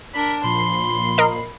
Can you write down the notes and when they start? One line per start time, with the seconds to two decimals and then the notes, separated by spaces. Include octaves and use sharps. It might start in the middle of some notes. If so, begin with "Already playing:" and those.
0.14 D4 A#4 B5
0.44 A#2 F3 B5 C6 C7
1.18 A#4 D#5